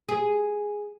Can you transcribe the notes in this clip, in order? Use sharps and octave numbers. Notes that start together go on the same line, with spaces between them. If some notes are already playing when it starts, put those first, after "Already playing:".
G#4